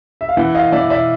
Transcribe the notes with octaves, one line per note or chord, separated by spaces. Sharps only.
E5
F5
E3 E5 F#5
D#5 F5
E3 D5 E5
D5 E5